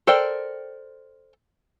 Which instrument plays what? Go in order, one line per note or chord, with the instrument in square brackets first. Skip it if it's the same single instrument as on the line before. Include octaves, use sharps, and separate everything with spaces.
[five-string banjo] A4 A#4 C5 D5 G5